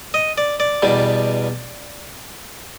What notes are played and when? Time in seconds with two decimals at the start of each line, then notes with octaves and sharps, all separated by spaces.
0.14 D#5
0.38 D5
0.60 D5
0.82 E2 B2 G3